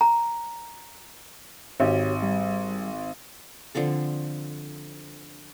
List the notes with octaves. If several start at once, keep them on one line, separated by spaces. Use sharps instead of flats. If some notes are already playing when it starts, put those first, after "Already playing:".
A#5
G#1 F#4 G4 C#5
G3
D3 F3 C4 A4